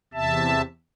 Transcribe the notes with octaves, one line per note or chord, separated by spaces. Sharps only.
E2 C3 E5 A5